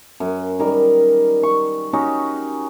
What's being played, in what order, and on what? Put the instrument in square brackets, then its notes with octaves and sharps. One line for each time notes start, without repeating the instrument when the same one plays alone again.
[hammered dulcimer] F#2
D#3 G3 A#4
C#6
C#4 D#4 F#4 G4